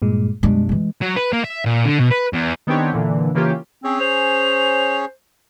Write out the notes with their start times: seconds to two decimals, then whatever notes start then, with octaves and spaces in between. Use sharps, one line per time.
0.02 G2 A#2 G#3
0.43 F#2 B2 G3 G#3 D4
0.69 E3 G#3
1.01 F#3
1.16 B4
1.33 A#3
1.44 E5
1.66 A#2
1.85 D3
1.99 B2
2.11 B4
2.33 E2
2.67 D#3 B3 C4 D4 G4 C#5
2.93 A#2 D3 E3
3.35 C#3 E3 A#3 C#4 F4 G4
3.84 C4 C#4 G#4 C#5
4.00 C5 F7